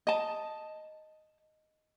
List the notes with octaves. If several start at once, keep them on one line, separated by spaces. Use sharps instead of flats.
D#5 A5